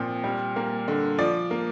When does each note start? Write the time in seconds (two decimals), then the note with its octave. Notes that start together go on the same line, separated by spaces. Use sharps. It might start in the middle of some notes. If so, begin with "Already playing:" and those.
Already playing: A#2 F3 C4
0.24 G3
0.56 A#3
0.88 D3
1.18 F3 D5
1.51 A#3